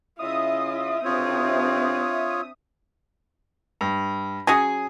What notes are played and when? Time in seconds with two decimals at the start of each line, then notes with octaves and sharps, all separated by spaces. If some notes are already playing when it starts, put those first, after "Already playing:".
0.19 C#3 C#4 E4 F4 D#5 E5 D#6
1.05 B1 C3 C4 D4 F4 C#5
3.81 G2
4.47 F#3 C#4 G#4 G#5